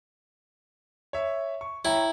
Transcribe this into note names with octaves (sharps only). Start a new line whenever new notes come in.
C#5 E5
C#6
E4 C#5 G5 A#5